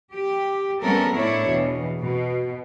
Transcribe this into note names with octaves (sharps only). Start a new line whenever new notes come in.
G4
G3 A3 B3 C#4 A4 A#4
A2 A3 D4 E4 C#5
E2 B2
B2